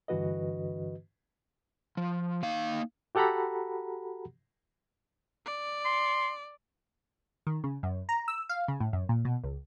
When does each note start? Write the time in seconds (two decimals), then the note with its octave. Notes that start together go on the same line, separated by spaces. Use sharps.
0.08 G2 D3 E3 F#4 B4 D#5
1.97 F3
2.43 A#3 D#4 F5
3.15 F#4 G4 A4 F#5 A#5 B5
5.46 D5
5.85 C6
7.47 D#3
7.64 C#3
7.83 F#2
8.09 A#5
8.28 E6
8.49 F5
8.68 C#3
8.80 A2
8.93 F#2
9.09 A#2
9.25 B2
9.43 C#2